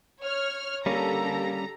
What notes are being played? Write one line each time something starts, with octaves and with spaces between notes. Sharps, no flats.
C#5 F6
D3 G3 A#3 C#4 G4 A4 A#5